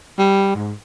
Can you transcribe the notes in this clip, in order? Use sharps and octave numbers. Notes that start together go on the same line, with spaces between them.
G3
G#2